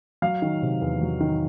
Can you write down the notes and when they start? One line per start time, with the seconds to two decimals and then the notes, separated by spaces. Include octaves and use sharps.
0.22 F#3 F5
0.42 D#3
0.62 C3
0.81 E2
1.01 F#3
1.21 D#3